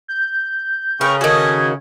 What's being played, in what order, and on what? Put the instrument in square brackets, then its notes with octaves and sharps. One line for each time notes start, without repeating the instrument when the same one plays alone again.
[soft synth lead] G6
[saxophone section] C#3 [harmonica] C#4 G5 C#6 [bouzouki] A#4 B4
[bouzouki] D#3 F#4 [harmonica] G#4 A4 D#5 [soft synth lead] G#6